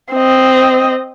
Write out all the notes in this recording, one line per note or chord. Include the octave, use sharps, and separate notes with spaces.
C4 D#5